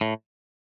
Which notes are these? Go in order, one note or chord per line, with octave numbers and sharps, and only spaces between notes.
A2